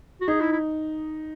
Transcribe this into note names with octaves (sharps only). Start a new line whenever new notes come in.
F#4
D#4 G#4
E4
E4